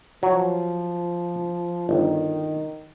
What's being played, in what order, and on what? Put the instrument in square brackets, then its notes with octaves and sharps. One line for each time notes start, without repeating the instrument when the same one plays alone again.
[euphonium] F3 [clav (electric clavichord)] F#3
[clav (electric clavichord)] G1 [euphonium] D#3